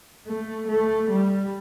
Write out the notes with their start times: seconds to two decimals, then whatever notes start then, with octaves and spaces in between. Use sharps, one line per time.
0.27 A3
0.68 A3
1.10 G3